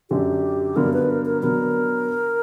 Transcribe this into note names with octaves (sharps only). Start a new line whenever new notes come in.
F#2 D3 F#3 G4
G2 D3 F#3 B3 A#4
B4
A#4
A#4
D3 F#3 B3 A#4